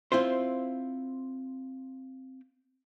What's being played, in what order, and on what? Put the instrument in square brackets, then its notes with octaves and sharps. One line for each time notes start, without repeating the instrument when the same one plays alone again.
[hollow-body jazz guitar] C4 E4 F4 C5